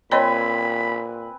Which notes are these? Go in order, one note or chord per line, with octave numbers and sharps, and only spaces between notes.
A#2 C4 B4 C#5 D#5 G#5 A#5 B5